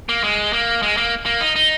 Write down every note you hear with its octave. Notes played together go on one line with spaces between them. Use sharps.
A#3
G#3
A#3
G#3
A#3
A#3
D#4
D#4